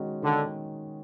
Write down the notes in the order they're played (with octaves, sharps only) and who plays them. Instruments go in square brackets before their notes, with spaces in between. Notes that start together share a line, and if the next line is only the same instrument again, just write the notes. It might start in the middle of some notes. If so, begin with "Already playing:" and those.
Already playing: [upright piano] D#3 G#3 C#4 F#4
[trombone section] D3 [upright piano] D#3